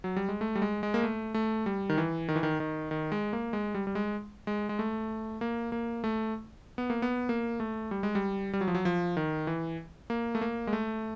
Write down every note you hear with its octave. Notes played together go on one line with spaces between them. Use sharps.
F#3
G3
G#3
A3
G3
G#3
G#3
A#3
A3
A3
G3
D#3
E3
D#3
E3
D#3
D#3
D#3
G#3
A#3
G#3
G3
G3
G#3
G#3
G#3
A3
A#3
A#3
A3
B3
A#3
B3
A#3
A3
G3
G#3
G3
G3
F#3
F3
F#3
F3
D#3
E3
A#3
A3
A#3
G#3
A3